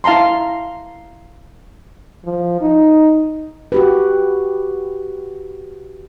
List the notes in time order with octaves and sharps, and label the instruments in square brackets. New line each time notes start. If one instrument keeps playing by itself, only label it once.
[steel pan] E4 F5 A5 A#5 C6
[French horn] F3
D#4
[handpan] F#4 G4 B4